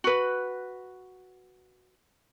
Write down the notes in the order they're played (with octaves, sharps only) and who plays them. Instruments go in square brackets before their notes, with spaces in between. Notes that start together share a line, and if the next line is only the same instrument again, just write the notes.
[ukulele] F#4 B4